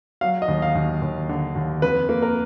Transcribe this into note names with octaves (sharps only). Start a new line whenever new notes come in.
F#3 F5
D#5
D#2
F5
D#2
D#2
D3
D#2
F2 B4
A#3
A#4